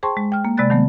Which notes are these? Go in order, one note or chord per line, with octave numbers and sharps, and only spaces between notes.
G#4 C5 G5 A5 C6 C#6
G#3
G5 F6
A#3
C3 G#3 D5 B5 F#6 A6
D#3 F#3 A3 B3